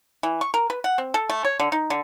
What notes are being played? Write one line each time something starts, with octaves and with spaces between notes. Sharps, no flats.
E3
C#6
A#4
B4
F#5
C4
A4
A3
C#5
D3
D#4
D3